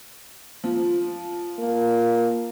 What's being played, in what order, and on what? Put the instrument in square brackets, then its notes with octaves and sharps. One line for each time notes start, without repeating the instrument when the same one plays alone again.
[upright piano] F3
[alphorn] A#3